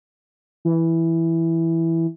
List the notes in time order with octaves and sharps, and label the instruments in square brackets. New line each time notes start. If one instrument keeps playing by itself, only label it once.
[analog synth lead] E3